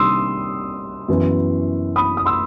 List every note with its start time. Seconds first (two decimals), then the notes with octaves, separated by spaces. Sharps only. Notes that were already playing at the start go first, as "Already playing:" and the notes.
Already playing: C3 D#3 G3 C6 D#6 E6
1.09 F#2 E3 B3
1.96 B5 D#6
2.17 D#6
2.26 C6 E6